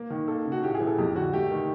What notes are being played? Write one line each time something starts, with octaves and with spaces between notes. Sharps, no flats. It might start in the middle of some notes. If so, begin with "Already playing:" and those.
Already playing: A#3
D#3
A#3 A4
C#3
F#4
A2 G4
G#4
E3
A4
F2 G4
D3 F#4
A3 G4
D#3